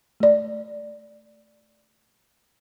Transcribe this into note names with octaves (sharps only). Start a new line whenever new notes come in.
A3 D5